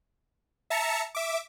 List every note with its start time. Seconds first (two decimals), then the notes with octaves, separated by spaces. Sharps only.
0.70 E5 A5 A#5 C#7
1.15 E5 D6